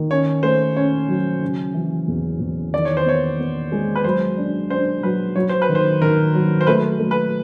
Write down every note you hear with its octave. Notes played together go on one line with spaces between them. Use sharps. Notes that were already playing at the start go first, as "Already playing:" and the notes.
Already playing: D#3
C#4 C#5
A3 C5
C#4 C#5
F#3
C#3
E3
E2
E2
D#3 D5
C#5
C5
B3 C#5
B3
G#3
B4
F#3 C5
D4
D4 C5
F#3 B4
F#3 C#5
C5
B4
D#3
C5
D#3 A#4
F#3
C5
A3 B4
A3
B4